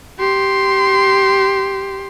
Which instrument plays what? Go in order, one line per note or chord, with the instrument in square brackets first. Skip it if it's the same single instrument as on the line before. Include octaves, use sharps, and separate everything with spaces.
[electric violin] G4 C6